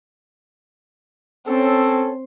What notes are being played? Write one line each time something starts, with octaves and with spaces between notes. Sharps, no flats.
C4 C#4 A4